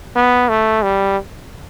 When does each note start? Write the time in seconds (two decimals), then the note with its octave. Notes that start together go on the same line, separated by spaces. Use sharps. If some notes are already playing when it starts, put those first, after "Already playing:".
0.16 B3
0.49 A3
0.82 G3